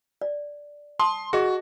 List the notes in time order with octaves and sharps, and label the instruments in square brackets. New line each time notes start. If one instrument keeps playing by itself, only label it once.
[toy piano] D5
[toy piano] A5 D#6 [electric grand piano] C6
[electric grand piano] F#4 [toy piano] G#4 D#5